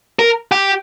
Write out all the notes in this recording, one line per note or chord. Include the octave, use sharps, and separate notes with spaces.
A#4
G4